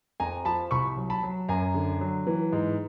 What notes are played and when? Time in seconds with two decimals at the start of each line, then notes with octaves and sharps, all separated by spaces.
0.20 F2 G#5 A#5
0.45 F3 A5 B5
0.71 C2 B5 C#6
0.97 F#3
1.10 A5 B5
1.23 F#3
1.49 F#2 G#5 A#5
1.74 D3
2.01 F#3
2.27 E3
2.52 G#2